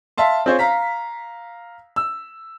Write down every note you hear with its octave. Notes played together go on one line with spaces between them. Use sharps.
E5 F5 A5 C6
C4 F4 G#4 C5 C#5
F5 A#5 B6
E6